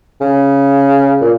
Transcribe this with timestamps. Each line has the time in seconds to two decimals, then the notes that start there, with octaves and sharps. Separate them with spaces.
0.21 C#3
1.21 A#2